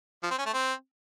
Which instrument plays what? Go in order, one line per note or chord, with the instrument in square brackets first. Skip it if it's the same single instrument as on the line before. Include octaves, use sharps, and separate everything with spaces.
[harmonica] F3
C4
C#4
A3
C4